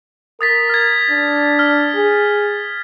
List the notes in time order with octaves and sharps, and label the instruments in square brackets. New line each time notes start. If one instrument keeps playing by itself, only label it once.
[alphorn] A#4 [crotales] D#6 A6 B6
[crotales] F6 G#6
[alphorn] D4
[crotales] F6
[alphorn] G#4